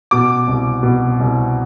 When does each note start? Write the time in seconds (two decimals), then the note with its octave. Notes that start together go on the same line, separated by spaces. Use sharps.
0.11 B2 D6
0.47 C2
0.83 B2
1.19 C2